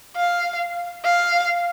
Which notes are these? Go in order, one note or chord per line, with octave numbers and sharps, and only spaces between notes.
F5
F5